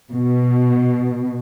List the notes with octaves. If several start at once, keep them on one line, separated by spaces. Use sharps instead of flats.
B2